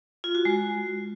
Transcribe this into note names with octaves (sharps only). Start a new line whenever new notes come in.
F4
F#4
G#3